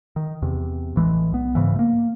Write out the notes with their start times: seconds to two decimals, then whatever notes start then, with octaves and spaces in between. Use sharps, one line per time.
0.16 D#3
0.42 E2 C3
0.96 A1 E3 G#3
1.32 B1 B3
1.55 G#2 C#3 E3
1.76 A3 A#3